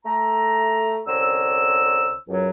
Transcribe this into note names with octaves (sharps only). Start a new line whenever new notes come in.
A3 A#5
C2 D3 C#4 C5 A#5 E6
C#2 F#2 F#3